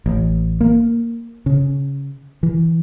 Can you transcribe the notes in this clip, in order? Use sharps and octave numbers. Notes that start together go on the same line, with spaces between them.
A1
A#3
C#3
E3